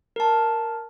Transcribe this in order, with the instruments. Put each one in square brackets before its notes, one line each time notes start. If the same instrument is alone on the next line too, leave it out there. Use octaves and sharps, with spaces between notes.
[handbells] A#4 A5